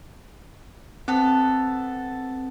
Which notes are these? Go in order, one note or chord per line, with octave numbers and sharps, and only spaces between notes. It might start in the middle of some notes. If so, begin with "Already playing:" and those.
B3 C4 A4